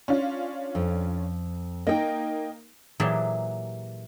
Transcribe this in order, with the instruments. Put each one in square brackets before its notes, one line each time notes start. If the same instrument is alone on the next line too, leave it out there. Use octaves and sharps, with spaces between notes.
[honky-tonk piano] C#4 D4 F4
[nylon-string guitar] F2
[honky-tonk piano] A#3 D#4 [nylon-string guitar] D#5 G5
[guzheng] A#2 E3 F#3 G4 G#4 A5